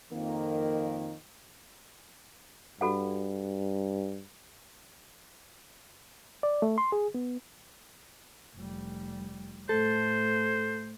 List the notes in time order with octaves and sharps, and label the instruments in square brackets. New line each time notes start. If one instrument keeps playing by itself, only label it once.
[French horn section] F2 D#3 A#3
[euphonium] G2 [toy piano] F#4 A4 F#5
[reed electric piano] D5
A3
C6
G#4
B3
[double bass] F1 G3
[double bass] A2 A3 [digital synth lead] A4 [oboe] C5